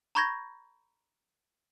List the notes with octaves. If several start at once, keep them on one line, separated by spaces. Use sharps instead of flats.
A#5 B5 C#6 G6 G#6 A#6